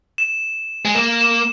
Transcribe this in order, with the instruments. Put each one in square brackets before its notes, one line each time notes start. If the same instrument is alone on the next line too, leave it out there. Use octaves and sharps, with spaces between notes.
[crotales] E7
[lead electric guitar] G#3
[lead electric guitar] A#3 [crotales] E7
[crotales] E7